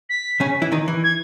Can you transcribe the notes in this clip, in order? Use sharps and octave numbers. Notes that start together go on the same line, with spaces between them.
B6
C#3 C#4
E3 E4
D#3 D#4
E3
G#6